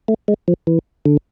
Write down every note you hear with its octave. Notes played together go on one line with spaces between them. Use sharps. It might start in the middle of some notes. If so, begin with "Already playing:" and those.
A3
G#3
F3
E3
D3